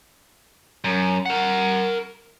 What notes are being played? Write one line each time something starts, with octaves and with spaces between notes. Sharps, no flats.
F#2
A#4 F#5